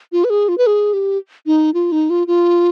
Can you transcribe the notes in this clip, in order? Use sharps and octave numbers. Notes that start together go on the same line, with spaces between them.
F4
B4
G#4
F4
B4
G#4
G4
D#4
F4
D#4
F4
F4